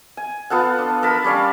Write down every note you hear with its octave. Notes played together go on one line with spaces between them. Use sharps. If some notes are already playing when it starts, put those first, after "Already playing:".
G#5
B3 F4 A4 F#5
D4
A4 A#4 A5 B5
G3 C#4 D5 F5